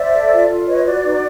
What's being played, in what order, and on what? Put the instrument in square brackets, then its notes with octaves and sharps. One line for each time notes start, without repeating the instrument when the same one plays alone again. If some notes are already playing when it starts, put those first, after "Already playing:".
Already playing: [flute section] C5 D5 E5
A4
F4
F4
B4 C#5 D#5
F#4 D5
D#4